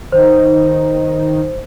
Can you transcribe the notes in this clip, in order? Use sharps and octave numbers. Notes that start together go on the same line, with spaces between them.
D#3 D#4 C5